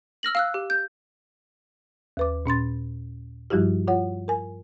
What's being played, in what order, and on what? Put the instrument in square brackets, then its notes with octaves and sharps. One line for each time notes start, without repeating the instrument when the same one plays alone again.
[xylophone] E6 F6 A#6 F#7
F5 E6 F#6
G4
G6
[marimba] D#2 B4 D6
A#2 C#4 C6 A6
G2 F3 G3 E4 F#4 G4
F4 C#5 F#5
A#4 G#5